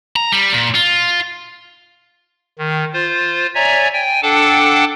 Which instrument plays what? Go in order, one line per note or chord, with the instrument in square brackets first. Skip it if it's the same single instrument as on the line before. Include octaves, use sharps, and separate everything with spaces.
[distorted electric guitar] A#5
G3
A#2
F4
[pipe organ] D#3
F4 C5
C#5 D5 E5 G#5 A#5
G5 G#5
D4 A4 F#5 G5 A5 D6